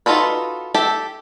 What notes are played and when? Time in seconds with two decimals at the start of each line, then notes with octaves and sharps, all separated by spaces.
0.06 D#4 F4 F#4 A4 B4
0.74 G4 A4 E5